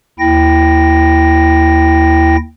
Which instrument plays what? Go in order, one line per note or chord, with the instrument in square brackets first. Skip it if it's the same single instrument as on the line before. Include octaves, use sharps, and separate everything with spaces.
[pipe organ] D#2 E4 G5 A#6